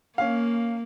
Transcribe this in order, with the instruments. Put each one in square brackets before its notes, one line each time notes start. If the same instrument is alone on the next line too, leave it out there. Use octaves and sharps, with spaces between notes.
[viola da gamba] A#3 [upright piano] C#4 F5